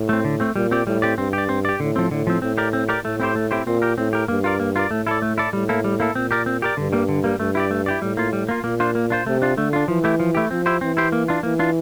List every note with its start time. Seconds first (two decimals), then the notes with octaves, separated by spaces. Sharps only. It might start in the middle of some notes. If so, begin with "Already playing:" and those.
Already playing: A2
0.09 A3 C4
0.25 D3
0.40 A3 C4
0.56 A#2 G3
0.71 C4 G4 D5
0.86 A2 G3
1.02 C4 G4 D5
1.17 G2 C4
1.33 G4 D5
1.49 C4
1.65 G4 D5
1.80 A2 D3
1.96 F3 C4
2.11 A2 D3
2.27 F3 C4
2.42 A2 C4
2.57 G4 A#4 D5
2.73 C4
2.89 G4 A#4 D5
3.04 A2 A3
3.20 C4 E4 G4 C5
3.35 A3
3.51 C4 E4 G4 C5
3.66 A#2 C4
3.82 G4 A#4
3.98 A2 C4
4.13 G4 A#4
4.28 G2 A#3
4.44 F4 A#4 D5
4.60 A#3
4.76 F4 A#4 D5
4.91 A2 A3
5.07 E4 A4 D5
5.22 A3
5.38 E4 A4 D5
5.53 A2 G3
5.69 A#3 E4 A4
5.84 G3
6.00 A#3 E4 A4
6.15 A#2 C4
6.31 G4 A#4 D5
6.46 C4
6.62 G4 A#4 D5
6.77 G2 D3
6.93 G3 A#3
7.09 D3
7.24 G3 A#3
7.39 G2 A3
7.55 E4 G4 D5
7.71 A3
7.86 E4 G4 D5
8.02 A2 G3
8.17 A#3 F4
8.33 G3
8.49 A#3 F4
8.64 A#2 A#3
8.80 D4 F4 C5
8.95 A#3
9.10 D4 F4 C5
9.26 C3 A3
9.42 D4 F4
9.57 D3 A3
9.73 D4 F4
9.88 E3 F3
10.04 A3 E4 G4
10.20 F3
10.35 A3 E4 G4
10.51 F3 C4
10.66 E4 G4 C5
10.81 E3 C4
10.97 E4 G4 C5
11.12 A#3
11.28 D4 F4
11.43 E3 A#3
11.59 D4 F4